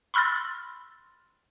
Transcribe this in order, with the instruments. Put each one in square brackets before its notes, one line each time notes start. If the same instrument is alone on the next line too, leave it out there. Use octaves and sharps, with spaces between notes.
[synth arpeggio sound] B5 C6 E6 F6 A6